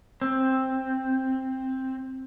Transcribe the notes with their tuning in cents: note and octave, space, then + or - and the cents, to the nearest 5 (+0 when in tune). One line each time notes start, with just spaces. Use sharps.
C4 +10